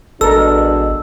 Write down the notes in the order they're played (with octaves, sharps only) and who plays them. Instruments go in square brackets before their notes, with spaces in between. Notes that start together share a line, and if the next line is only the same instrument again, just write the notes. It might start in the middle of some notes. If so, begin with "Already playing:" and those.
[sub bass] A1 [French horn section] B2 G#3 D4 [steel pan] A4 A#4 [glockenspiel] E6